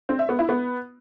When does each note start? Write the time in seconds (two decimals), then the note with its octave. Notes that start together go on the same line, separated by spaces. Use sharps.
0.09 C4
0.19 E5
0.29 B3
0.39 E4
0.49 B3